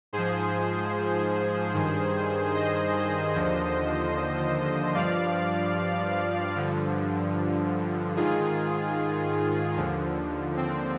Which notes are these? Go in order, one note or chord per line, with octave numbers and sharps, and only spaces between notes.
G#2 F3 G#4 C5
G2 D#3
C5 D#5
C5 D#5
D#2 D3 F3
G2 F3 D5 F5
G2 D3 F3
G#2 D#3 F4 G#4
D#2 D3 F3
C4